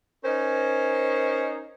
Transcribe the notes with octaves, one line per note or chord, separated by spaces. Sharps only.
C#4 D#4 A#4 C5